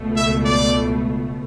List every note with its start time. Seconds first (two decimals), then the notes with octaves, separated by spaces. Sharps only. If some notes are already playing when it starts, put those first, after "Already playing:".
Already playing: C#2 B2 A3
0.16 E5
0.45 D5